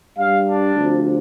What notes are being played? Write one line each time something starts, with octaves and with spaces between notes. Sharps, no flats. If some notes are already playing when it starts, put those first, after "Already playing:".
G2 G3 F5
D4
D2 C3 F3